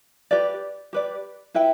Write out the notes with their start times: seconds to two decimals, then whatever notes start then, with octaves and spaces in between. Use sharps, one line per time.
0.31 G4 B4 D5
0.93 G4 B4 D5
1.54 E4 B4 E5 G5